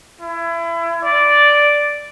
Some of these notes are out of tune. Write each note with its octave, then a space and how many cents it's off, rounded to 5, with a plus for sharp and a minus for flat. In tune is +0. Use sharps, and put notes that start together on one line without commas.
E4 +30
D5 -5